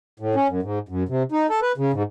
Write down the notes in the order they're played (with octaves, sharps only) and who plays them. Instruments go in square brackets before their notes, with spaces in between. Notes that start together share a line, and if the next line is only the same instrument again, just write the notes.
[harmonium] A2
C#4
F#2
G#2
F#2
C3
D#4
A4
B4
C#3
G#2